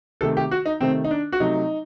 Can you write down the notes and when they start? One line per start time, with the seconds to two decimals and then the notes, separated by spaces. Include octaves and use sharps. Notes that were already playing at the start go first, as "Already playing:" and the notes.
0.21 C3 D#3 A3 A4
0.37 G4
0.51 F#4
0.66 D#4
0.80 C3 D#3 A3 C4
1.04 D#4
1.11 D4
1.32 F#4
1.40 C3 F#3 A3 D#4